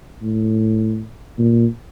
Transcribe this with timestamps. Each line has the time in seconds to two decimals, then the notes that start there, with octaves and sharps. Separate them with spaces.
0.22 A2
1.38 A#2